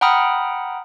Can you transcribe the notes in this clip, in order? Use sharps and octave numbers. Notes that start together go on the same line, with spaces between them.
F#5 G5 A#5 B5 D#6 F6